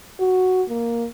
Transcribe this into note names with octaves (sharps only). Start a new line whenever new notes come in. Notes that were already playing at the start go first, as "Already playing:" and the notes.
F#4
A#3